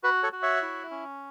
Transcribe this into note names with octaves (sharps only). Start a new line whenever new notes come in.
F#4 B4
A4 C#5
F#4
C#5 E5
E4
C#4